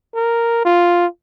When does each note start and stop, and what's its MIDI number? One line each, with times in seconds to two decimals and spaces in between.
0.15 0.62 70
0.65 1.06 65